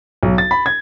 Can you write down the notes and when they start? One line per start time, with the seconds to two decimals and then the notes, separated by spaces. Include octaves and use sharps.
0.23 B1
0.38 A6
0.51 B5
0.66 G#6